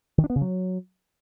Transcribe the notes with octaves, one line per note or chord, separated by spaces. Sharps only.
D#3
D4
B3
C#3
F#3